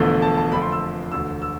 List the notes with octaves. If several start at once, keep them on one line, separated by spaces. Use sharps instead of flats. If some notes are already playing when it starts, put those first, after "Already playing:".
Already playing: E1 E2 D3 F3 A3
A5
A5
F2 D3 F3 A3 B5
C6
E6
E1 D2 D3 E6
E6